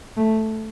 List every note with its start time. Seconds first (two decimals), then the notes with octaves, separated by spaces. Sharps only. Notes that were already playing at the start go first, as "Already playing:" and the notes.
0.17 A3